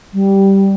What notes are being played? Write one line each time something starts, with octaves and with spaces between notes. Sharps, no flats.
G3